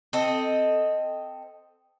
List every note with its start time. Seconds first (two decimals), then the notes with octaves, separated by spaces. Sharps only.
0.13 C4 A4 D#5